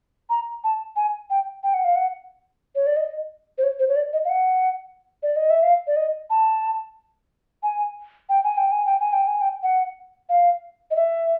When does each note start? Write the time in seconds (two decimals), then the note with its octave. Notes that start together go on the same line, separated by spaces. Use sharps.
0.30 A#5
0.64 A5
0.96 G#5
1.30 G5
1.63 G5
1.74 F#5
1.84 F5
1.96 F#5
2.75 C#5
2.87 D5
2.96 D#5
3.58 C5
3.63 C#5
3.79 C5
3.89 C#5
3.96 D5
4.13 D#5
4.25 F5
4.29 F#5
5.23 D5
5.36 D#5
5.50 E5
5.63 F5
5.87 D5
5.96 D#5
6.30 A5
7.63 G#5
8.29 G5
8.44 G#5
8.58 G5
8.72 G#5
8.86 G5
9.00 G#5
9.13 G5
9.27 G#5
9.41 G5
9.63 F#5
10.29 F5
10.91 D#5
10.96 E5